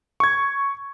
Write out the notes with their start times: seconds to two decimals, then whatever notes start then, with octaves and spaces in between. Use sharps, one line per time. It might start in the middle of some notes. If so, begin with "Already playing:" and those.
0.20 C#6 G#6